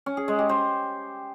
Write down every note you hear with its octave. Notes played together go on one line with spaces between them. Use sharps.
C#4
G#4
G#3
G4
C5